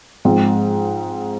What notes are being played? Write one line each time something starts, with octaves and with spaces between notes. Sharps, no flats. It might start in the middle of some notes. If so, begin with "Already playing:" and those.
G#2 F3 C4